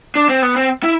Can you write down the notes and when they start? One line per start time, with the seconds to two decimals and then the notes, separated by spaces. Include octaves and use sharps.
0.16 D4
0.29 C4
0.42 B3
0.56 C4
0.83 E4